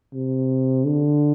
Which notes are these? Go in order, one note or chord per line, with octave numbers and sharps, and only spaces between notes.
C3
D3